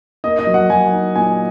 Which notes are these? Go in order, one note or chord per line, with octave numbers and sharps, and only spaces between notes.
A#3 D#5
D#5
F#3
F#5
F#3 G#5
D#4
A#2 G#5